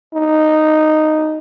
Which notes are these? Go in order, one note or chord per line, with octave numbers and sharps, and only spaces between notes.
D#4